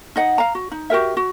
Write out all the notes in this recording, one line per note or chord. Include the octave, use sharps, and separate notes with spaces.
D#4 D#5 F#5
F5 A#5
F#4
D#4
F#4 G4 A#4 E5
F#4